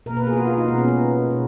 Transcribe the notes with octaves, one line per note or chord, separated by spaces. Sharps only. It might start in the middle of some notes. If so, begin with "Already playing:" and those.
B2 A#3 A#4
B4
G#4
F4
F#4
F4
D#4
B2 G#3 B3
C#4
D#4
B2 G#3